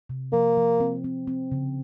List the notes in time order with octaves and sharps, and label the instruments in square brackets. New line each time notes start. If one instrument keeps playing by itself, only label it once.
[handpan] C3
[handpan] F3 [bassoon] A#3
[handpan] F3
C4
C4
C4
C#3